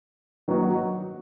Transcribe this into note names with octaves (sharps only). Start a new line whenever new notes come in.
D#3 F#3 A#3 D#4 F#4